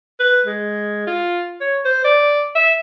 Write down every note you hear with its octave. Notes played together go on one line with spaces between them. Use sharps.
B4
G#3
F4
C#5
C5
D5
E5